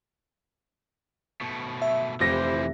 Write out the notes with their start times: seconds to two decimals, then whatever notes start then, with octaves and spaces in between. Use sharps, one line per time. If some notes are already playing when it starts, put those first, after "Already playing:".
1.41 B2 A3
1.82 E5
2.20 F1 E3 F3 E4 G4 C5 A#6